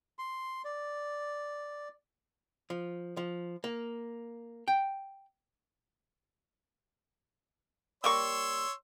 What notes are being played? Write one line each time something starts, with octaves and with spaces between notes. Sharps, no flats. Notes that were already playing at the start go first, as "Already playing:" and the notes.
C6
D5
F3
F3
A#3
G5
G3 A#3 C#5 C6 C#6 E6